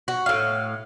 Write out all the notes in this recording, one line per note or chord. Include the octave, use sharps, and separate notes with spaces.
F#4
A2 F5